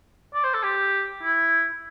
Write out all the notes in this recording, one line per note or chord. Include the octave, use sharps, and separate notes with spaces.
D5
C5
A4
G4
E4